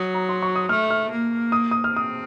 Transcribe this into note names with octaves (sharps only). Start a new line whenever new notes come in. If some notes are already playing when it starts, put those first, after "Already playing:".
Already playing: F#3 D#6
A#5
C6
C#6
D#6
A3 F6
F6
A#3
D#6
D#6
F6
C4 D#6